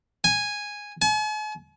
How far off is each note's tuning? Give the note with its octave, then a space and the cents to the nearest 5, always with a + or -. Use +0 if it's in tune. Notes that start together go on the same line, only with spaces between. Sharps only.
G#5 -5
G#5 +45